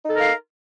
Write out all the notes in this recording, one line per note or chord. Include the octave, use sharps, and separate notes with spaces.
D#4 A4 A#4 F5